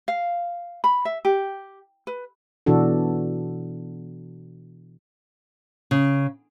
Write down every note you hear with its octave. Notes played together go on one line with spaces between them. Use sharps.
F5
B5
E5
G4
B4
B2 E3 D4 F#4 A4
C#3